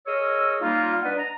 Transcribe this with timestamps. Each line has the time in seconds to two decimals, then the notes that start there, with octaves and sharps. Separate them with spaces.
0.07 G#4 A#4 C#5 D#5 E6
0.61 G3 A#3 D#4 F4
1.04 D4 B4 D5 D#5 F#5
1.18 A#5